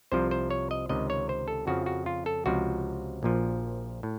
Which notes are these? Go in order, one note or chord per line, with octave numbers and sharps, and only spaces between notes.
C2 C3 F3 C5
C5
C#5
D#5
C#2 C3 D#3 D#5
C#5
C5
A4
F2 C#3 F3 F#4
F#4
F4
A4
C#2 C3 F3 F#4
A#1 A#2 F3
A2